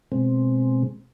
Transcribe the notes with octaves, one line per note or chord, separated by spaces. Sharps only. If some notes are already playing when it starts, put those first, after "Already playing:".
B2 G#3 C4